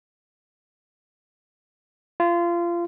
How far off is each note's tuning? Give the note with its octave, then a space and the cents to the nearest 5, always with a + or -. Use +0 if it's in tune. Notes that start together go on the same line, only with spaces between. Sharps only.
F4 -25